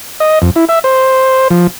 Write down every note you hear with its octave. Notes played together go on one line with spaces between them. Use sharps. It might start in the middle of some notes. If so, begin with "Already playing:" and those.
D#5
F2
E4
E5
C5
F3